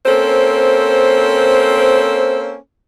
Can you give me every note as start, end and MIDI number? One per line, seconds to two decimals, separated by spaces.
0.06 2.55 58
0.06 2.55 60
0.06 2.55 61
0.06 2.55 69
0.06 2.55 72